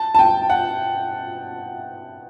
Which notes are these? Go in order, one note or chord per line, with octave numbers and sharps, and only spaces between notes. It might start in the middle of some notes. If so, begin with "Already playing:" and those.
Already playing: A5
A5
G5
F#5